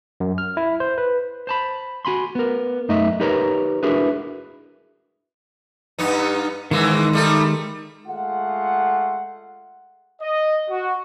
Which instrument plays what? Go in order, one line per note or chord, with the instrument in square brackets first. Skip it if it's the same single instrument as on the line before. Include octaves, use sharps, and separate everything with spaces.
[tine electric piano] F#2
F6
E4
C5
B4
[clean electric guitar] C5 A5 B5
F#4 G#5 B5 C6
B3 A#4
F#2 A3 D#4 D#5 E5
D#4 G4 A#4 B4 C#5 A#5
D4 E4 F#4 G#4 A#4 B4
[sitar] G2 B3 D#4
[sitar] G#2 E3 A#3 [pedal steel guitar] D#3 G#3 E6
[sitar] G3 A3 D#4
[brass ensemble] G#3 A3 F4 F#5
[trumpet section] D#5
F#4